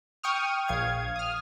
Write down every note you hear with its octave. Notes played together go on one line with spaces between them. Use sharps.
G5 C#6 D#6 F6
A#1 F5 G#6
D#6 F6